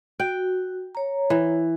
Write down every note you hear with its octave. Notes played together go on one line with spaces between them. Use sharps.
F#4 G5
C#5 A#5
E3